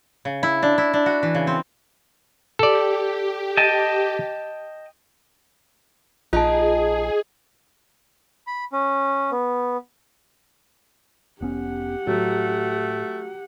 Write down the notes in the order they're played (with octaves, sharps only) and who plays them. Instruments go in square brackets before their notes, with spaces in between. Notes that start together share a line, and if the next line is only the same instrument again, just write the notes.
[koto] C#3
E4
D4
E4
D4
F#4
E3
C#3
C4
[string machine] G4 [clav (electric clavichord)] A4 D5
[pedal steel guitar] D#5 G5 A5
[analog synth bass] A#1 [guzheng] D#4 [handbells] F4 A5 [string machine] G#4
[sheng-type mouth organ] B5
C#4
B3
[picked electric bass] F1 B3 C#4 [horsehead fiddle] G4 F#5
[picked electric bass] A2 [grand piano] F#3 [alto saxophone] A3